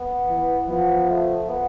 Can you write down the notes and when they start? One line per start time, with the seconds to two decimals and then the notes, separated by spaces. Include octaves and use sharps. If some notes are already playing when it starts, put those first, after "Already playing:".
Already playing: B3
0.28 E3
0.69 F3 B3
1.09 A3
1.49 B3